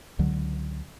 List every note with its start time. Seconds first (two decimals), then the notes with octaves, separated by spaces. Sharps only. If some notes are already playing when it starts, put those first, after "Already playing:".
0.19 C#2 D3 F#3